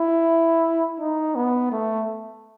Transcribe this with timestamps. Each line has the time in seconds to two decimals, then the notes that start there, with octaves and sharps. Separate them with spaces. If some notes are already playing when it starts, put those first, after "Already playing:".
Already playing: E4
1.00 D#4
1.35 B3
1.72 A3